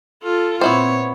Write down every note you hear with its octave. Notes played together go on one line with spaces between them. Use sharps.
F4 A4
A#2 B3 C4 E4 C5 C#5